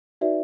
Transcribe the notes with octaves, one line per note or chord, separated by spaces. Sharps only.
D#4 F#4 B4 D5 E5